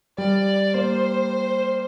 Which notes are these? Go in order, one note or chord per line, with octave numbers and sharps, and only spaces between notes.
G3 D5
A#3 C5